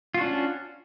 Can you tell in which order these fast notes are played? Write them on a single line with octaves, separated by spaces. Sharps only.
F4 F#4 D4 C#4